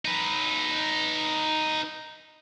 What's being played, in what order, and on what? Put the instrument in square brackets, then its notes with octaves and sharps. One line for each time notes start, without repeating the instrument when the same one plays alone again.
[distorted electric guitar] D#4 B4